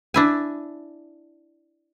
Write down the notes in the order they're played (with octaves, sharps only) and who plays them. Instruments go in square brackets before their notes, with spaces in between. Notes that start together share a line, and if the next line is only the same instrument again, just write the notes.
[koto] D4 E4 G#5